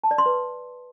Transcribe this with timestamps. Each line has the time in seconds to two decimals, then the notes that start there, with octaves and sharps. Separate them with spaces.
0.04 A5
0.11 D5
0.18 C6
0.26 B4